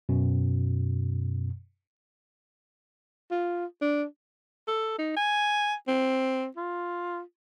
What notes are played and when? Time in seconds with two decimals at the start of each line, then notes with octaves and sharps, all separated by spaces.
0.09 F#2 B2
3.31 F4
3.81 D4
4.68 A4
4.99 D#4
5.17 G#5
5.88 C4
6.57 F4